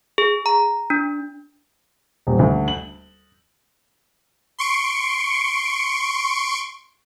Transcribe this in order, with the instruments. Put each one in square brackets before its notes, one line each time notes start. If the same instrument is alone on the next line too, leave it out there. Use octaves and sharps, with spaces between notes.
[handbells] G#4
A#5
D4
[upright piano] D#1
D2
F#7
[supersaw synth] C6 C#6 D7